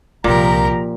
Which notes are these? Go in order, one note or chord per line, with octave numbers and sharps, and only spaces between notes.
C2 A#2 F3 C4 G4 A#4 A#5